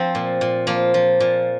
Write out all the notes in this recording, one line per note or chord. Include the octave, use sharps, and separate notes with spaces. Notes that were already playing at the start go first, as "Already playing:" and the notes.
Already playing: F3 C4
A#2
A#2
F3 A#3
F3
A#2